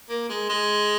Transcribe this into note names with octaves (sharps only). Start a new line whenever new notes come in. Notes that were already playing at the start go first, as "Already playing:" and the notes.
A#3
G#3
G#3